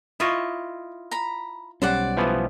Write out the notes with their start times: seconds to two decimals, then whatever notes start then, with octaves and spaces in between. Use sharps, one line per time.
0.20 E4 F4 D#5 C#6 D#6
1.11 A#5 B5
1.82 B1 G3 C#4 C5 D5 F#5
2.17 E3 F3 B3